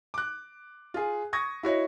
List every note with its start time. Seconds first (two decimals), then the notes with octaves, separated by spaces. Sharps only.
0.14 D6 F#6
0.94 F4 G#4
1.33 C#6 D#6 G#6 A#6
1.63 E4 F#4 C#5 D#5